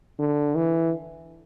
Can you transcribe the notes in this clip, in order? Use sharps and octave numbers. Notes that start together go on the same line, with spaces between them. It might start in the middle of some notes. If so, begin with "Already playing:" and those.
D3
E3